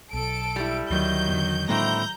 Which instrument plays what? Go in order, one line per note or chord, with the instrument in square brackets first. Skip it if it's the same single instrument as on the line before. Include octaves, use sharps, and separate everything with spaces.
[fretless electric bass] B1 [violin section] A4 D7
[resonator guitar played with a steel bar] G3 E4
[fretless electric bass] D2 [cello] D#3 F#3 [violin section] G6
[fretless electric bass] E2 D3
[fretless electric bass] A2 G#3 A#3 [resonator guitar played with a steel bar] D3 C4 E4 [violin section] A#5 G6